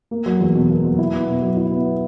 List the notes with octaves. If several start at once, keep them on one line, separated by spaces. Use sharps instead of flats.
A#3
F#3
E2
B2
A#3
F#3
E4
B3
B2
F#3
E4
B3